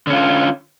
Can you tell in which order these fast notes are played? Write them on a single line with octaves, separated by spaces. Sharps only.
D3 C#4 F4